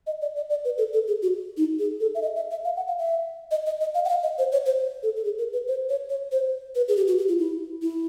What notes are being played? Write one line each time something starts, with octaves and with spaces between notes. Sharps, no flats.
D#5
D5
D5
D5
B4
A4
A4
G#4
F#4
D#4
G#4
A4
E5
D#5
E5
E5
F5
F#5
F5
E5
D#5
D#5
D#5
F5
F#5
F5
D#5
C5
C#5
C5
A4
A4
G#4
A#4
B4
C5
C#5
C#5
C5
B4
G#4
G4
F#4
G4
F4
E4
E4